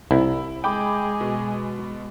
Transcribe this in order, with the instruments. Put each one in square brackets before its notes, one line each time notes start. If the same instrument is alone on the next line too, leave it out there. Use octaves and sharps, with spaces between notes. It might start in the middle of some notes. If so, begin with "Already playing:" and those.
[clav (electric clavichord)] C2 [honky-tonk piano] E4
[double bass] G#3 [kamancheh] G#4 D#5 [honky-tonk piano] G5 B5 D6
[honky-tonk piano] B2